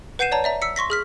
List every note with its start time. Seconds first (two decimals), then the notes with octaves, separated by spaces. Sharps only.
0.19 B4 F#5 G6 C7 D#7 E7
0.32 C#5 D5 A5 A#5
0.44 D5 E5 A#5
0.62 E6 B6 C#7
0.76 C6 C#6 A#6 B6
0.90 G#4 F6 B6